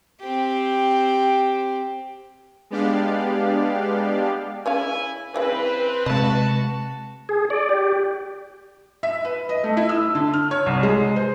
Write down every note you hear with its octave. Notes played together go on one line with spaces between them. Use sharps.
C4 G4
G#3 B3 D4 G4 D5 F5
C#3 C#4 E4 F5 G#5
C#3 E3 G3 C4 B4
C3 G#3 F#4 D#5 F5 A5
G#4
D5
G4
E5
B4
D#5
A3
E4
E6
D3
F6
C#5
C2
G#3
C5